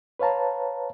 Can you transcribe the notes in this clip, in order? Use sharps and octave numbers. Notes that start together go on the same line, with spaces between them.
B4 C#5 F5 A5 A#5